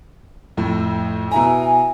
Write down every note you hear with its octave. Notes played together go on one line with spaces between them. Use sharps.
F2 A2
B2 E4 G#5 A#5